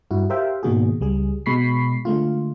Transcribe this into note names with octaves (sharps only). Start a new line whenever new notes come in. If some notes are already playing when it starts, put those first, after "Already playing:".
G2 E4 F#4
G4 A#4 C5 E5 F5 G5
G#2 B2 D#3 A#3 F#4 G#4
C#2 G3 G#4
B2 G#3 B5 C#6 B6 C7
D3 G#3 A3 F4